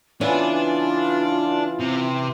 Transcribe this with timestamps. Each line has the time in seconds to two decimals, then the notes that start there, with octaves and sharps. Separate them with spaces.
0.21 C#3 E3 B3 D4 F4
1.80 C3